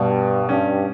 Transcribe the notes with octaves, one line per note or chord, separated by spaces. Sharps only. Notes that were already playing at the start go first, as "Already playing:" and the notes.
Already playing: G2 B2 G3 B3
G2 G3 C#4 G4